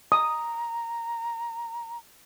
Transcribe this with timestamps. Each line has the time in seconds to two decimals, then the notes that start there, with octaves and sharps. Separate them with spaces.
0.12 A#5 D#6